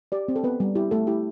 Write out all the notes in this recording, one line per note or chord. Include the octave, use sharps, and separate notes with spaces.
G4 D5
C4
A4
B3 B4
G3
E4 G4
A3 A4
E4 G4